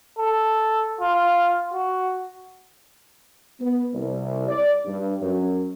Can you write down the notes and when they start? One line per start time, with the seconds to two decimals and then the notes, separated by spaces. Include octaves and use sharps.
0.19 A4
1.00 F4
1.73 F#4
3.60 B3
3.94 C2
4.49 D5
4.85 G2
5.21 F#2